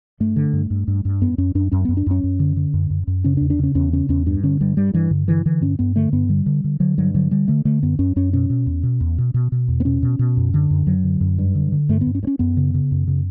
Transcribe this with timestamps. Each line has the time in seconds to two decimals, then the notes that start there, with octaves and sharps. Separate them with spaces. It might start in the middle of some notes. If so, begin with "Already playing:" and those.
0.20 G2 A3
0.36 D3
0.53 G2
0.70 G2
0.87 G2
1.05 G2
1.21 F#2 B3
1.38 F#2 C#4
1.55 F#2 D4
1.72 F#2 C#4
1.85 F#2 B3
1.97 D4
2.06 F#2 C#4
2.24 F#2
2.39 D3
2.57 D3
2.74 F#2
2.90 F#2
3.07 F#2
3.24 C#3 C#4
3.37 E2 D4
3.50 D4
3.59 C#3 C#4
3.75 E2 C#4
3.93 C#3 C#4
4.09 E2 C#4
4.26 G2 D4
4.43 D3 C#4
4.61 G2 G3
4.77 G2 G3
4.94 G2 E3
5.11 G2 D3
5.27 D3 E3
5.46 D3 E3
5.61 G2 C#4
5.79 G2 B3
5.96 D3 A3
6.13 G2 B3
6.29 D3 G3
6.46 D3
6.64 D3
6.80 D3 F#3
6.98 G2 F#3
7.14 D3 F#3
7.31 D3 G3
7.48 D3 A3
7.65 D3 A3
7.83 F#2 B3
7.99 F#2 C#4
8.16 F#2 C#4
8.33 B2 C#4
8.50 B2
8.66 E2
8.83 B2
9.00 E2
9.18 B2
9.34 B2
9.52 B2
9.68 E2
9.80 B3
9.85 B2 C#4
10.02 B2
10.19 B2
10.37 F#2
10.54 D3
10.70 F#2
10.87 F#2 F#3
11.04 D3
11.21 F#2
11.38 G2
11.55 D3
11.72 D3
11.89 G2 A3
12.01 B3
12.06 G2
12.15 C#4
12.23 G2
12.27 C#4
12.39 F#2 B3
12.57 C#3
12.74 C#3
12.91 F#2
13.07 C#3